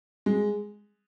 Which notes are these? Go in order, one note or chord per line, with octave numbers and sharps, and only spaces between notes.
G#3